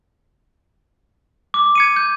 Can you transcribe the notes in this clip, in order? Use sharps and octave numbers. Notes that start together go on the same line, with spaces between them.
D6
G#6 C#7 D#7
G6